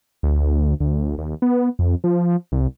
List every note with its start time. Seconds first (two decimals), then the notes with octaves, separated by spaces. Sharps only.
0.23 D2
0.80 D2
1.18 D#2
1.42 B3
1.79 F2
2.04 F3
2.52 C2